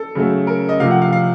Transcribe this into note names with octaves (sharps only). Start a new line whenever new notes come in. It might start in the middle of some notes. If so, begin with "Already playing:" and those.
Already playing: A4
C#3 F#3 A3
A#4
D#5
C3 F3 A3 F5
F#5
F5
F5